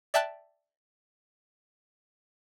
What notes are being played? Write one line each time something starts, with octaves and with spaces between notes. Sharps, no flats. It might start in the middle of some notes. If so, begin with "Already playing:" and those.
D5 E5 G5 A5 F#6 A6